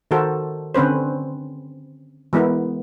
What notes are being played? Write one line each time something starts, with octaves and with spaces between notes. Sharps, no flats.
D#3 F#4 A4 A#4 C5
D3 C4 C#4 B4 C5
E3 G#3 B3 E4 A#4